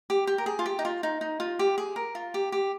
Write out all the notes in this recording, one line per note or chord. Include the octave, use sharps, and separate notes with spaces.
G4
G4
A#4
G#4
F4
G4
D#4
F4
D#4
D#4
F4
G4
G#4
A#4
F4
G4
G4